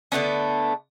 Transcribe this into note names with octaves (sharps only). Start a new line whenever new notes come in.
D3 A3 B3 C#4